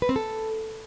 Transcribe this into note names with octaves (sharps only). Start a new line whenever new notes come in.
B4
C4
A4